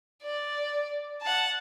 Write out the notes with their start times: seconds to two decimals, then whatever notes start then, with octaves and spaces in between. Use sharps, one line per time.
0.23 D5
1.22 F#5 A5